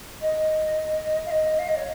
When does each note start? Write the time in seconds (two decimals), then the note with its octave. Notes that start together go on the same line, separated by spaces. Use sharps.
0.21 D#5
1.26 F5
1.31 D#5
1.59 F5
1.68 D#5
1.76 C#5